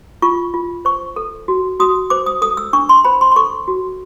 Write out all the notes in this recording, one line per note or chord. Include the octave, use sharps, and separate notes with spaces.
F4 C#6
F4
C5 C#6
A4
F#4
F#4 D#6
C5 D6
D#6
A4 D#6
E6
D4 C#6
C6
C5 B5
C6
C6
A4 C#6
F#4